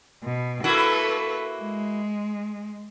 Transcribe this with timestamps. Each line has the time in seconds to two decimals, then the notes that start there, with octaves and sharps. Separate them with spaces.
0.23 B2
0.64 A#3 E4 F#4 A4 B4
1.61 G#3